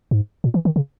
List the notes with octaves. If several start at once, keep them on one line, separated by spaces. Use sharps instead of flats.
G#2
A#2
E3
D#3
C#3